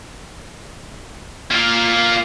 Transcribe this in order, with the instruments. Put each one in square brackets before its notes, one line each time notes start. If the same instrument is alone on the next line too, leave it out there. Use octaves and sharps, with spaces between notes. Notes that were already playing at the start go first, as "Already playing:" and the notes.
[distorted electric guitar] A#3 F4